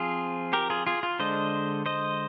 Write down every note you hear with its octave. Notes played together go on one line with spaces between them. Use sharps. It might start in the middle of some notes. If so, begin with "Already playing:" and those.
Already playing: F3 C4 F4 G#4
G4 A#4
F4 G#4
F4 G#4
F4
D3 G#3 D4 C5 D#5
C5 D#5